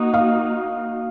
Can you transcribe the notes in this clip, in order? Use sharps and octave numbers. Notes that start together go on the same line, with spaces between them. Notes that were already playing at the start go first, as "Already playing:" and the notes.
Already playing: A#3 D#4 F#4
F5